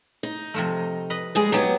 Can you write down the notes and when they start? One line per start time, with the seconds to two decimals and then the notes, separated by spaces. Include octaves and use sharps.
0.23 D#4
0.54 C3 F3 A3
1.10 B4 D#5
1.35 G3 G#3 G#4
1.52 F#3 B3 D#4 G4 G#4